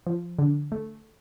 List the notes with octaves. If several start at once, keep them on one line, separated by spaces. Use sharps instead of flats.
F3
D3
A3